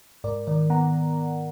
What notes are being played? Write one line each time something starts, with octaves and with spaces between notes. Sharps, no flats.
G#2 A#4 D5
D#3 A#4 D5
B3 F#5 A#5